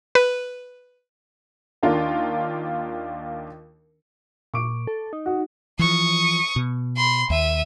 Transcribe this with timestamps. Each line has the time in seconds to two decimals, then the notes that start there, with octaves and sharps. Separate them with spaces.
0.15 B4
1.83 D#2 D4 F4 A#4
4.54 A#2 C#6 D6 D7
4.87 A4
5.13 D#4
5.26 F#4
5.79 E3 F3 C#6 D#6
6.56 B2
6.97 B5 C6
7.30 D#2 E5 D#7